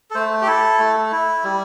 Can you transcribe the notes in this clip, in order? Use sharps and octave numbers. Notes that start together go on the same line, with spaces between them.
A4
A3 C5
G4
E4 A4
A3
E4
G3